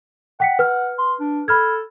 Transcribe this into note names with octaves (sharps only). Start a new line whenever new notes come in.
F#5 G5 B6 C#7
B4 F6
C6
D4
A4 B5 F6 G#6